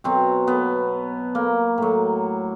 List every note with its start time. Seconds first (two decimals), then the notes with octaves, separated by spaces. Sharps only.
0.04 B2 F#3 C4
0.47 B3
1.35 A#3
1.78 A2 F#3